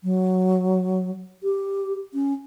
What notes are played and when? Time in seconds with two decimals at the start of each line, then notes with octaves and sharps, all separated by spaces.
0.04 F#3
1.43 G4
2.14 C#4